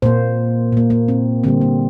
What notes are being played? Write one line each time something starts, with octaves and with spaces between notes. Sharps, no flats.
A#2 A#3 C5
A#2 A#3
A#3
C4
D3 G3 A#3 C4
A#3